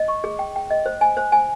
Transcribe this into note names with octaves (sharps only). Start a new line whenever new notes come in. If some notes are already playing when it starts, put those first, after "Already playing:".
Already playing: D#5
C#6
G#4
G5
G5
D#5
C5
G#5
C5
G#5